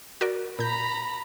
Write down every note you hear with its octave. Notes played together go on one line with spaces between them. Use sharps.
F#4 A#4 D5
A#2 A#5 B5 G6